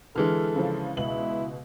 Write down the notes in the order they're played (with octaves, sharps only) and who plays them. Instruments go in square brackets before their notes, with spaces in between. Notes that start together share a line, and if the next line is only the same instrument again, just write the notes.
[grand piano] D3 E3 G#3 [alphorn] A4 [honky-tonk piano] F6
[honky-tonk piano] C#3 F3
[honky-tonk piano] C#2 B2 F#7 [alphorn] E4